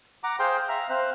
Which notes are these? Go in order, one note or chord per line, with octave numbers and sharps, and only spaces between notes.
F#5 A#5 D6
G#4 C5 F5 G5 C6
E5 F5 A#5 F6
C4 C5 F5 F#6